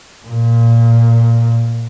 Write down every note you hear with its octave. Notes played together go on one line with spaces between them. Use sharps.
A#2